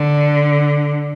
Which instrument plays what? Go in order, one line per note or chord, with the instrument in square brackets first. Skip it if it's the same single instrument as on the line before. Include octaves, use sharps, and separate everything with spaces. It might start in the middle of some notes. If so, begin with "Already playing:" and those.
Already playing: [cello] D3